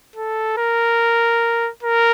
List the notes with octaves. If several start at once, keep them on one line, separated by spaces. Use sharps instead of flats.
A4
A#4
A#4